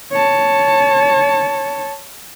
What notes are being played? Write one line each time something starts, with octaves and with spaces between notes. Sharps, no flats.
C#5 A5